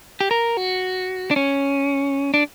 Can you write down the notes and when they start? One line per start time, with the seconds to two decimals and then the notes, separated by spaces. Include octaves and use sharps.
0.21 G4
0.31 A#4
0.57 F#4
1.31 D4
1.36 C#4
2.34 D4